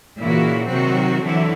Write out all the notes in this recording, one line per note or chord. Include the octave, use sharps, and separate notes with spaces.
A#2 C#3 E3 E4 F#4
C3 D#3 F#3 C4 F#4
D3 E3 F#3 E4